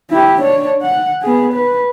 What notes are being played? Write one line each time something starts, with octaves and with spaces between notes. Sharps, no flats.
E4 G4
D4 C#5
F#5
B3 G#4
B4